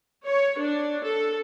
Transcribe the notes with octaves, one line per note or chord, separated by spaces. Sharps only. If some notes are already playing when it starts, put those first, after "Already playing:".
C#5
D4
A4